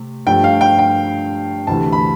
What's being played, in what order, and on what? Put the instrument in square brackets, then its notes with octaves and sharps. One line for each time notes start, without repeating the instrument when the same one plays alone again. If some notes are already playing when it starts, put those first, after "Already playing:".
Already playing: [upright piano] C3 A3
G2 F3 A3 G5
F5
G5
G5
D2 C3 E3 A3 A5
B5